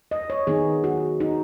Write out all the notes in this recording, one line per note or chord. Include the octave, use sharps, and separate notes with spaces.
D#5
C#5
D#3 B3 D#4 G#4
F#4
D#4